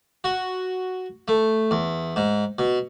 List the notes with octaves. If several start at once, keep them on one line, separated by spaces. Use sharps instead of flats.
F#4
A3
E2
G#2
B2